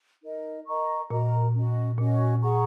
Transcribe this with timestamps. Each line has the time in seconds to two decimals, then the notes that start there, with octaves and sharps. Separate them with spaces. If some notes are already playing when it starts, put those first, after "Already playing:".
0.22 D#4 A#4 D#5
0.66 A#4 D#5 A#5 C#6
1.10 A#2 F#4 A#4 D#5 A#5
1.55 C#4 F#4 D#5
1.98 A#2 C#4 F#4 D#5
2.42 G#4 F#5 A#5 C#6